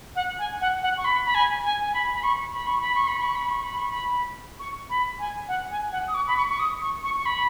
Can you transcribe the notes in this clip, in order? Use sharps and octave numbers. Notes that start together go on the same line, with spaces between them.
F#5
G#5
F#5
F#5
C#6
B5
B5
G#5
G#5
G#5
B5
B5
C#6
B5
C#6
B5
C#6
B5
C#6
B5
C#6
B5
C#6
B5
C#6
B5
G#5
F#5
G#5
F#5
D#6
C#6
B5
C#6
C#6
D#6
C#6
C#6
C#6
B5